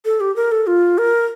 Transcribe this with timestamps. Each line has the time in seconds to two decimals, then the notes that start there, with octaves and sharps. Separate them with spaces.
0.05 A4
0.20 G4
0.36 A#4
0.52 A4
0.67 F4
0.98 A#4